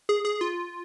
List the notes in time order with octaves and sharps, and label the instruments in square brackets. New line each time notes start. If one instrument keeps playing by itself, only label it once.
[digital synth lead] G#4
G#4
F4